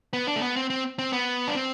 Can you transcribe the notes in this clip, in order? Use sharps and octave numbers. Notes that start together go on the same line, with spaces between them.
B3
D4
A3
B3
C4
C4
C4
B3
D4
C4